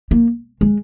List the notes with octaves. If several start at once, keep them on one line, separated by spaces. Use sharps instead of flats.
A#3
G#3